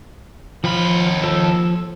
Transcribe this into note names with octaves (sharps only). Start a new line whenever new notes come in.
D#2 F3 F4 B5
F3 A4